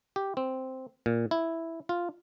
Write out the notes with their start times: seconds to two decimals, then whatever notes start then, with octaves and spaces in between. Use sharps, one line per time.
0.16 G4
0.37 C4
1.06 A#2
1.31 E4
1.89 F4